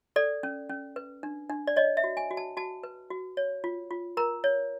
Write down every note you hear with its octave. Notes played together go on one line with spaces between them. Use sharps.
A4 D5
C#4
C#4
B4
D4
D4
D5
C#5 D#5
E5
F#4
G#5
F#4
A5
F#4 A5
B4
F#4
C#5
F4
F4
A#4 A#5
C#5